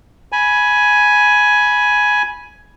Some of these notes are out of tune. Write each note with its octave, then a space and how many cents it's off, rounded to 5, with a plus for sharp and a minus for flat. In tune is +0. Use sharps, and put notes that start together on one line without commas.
G#5 +10 B5 -15